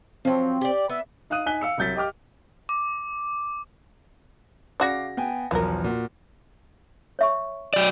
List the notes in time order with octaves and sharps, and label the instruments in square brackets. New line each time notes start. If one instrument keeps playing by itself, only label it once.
[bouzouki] F3 F#3 [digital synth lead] C4
[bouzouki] G4 D5
[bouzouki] B3 [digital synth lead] E5
[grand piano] D#4 F5 D#6 F#6 D#7
D#4 G#5 F#6 B6 G7
F5 E6 C#7
C2 F#3 G6 A6 B6
G4 D#5 G5 D6 F6
[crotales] D6
[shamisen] C#3 F#4 D5 [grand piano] F5 D6 A#6
[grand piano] B3 G5 G#5
[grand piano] B1 E2 F3 [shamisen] E3 A#4
[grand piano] A#2 F#4
[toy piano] C#5 E5 C#6
[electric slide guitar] F#3 D5